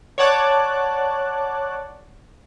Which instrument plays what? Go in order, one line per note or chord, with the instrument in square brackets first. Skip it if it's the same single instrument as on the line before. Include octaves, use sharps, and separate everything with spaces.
[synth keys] C#5 D5 F#5 A5 D6 F#6